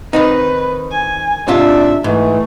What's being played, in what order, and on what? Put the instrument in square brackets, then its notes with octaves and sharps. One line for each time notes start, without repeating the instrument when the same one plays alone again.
[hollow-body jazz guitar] D#3 C4 D#4 [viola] B4
[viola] G#5
[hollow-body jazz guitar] G#2 C3 F4 [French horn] D4 [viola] E5
[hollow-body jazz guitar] G#2 [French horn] E3 [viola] A3